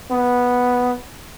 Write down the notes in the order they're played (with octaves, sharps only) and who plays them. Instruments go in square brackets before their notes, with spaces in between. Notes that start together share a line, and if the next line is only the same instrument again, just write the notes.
[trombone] B3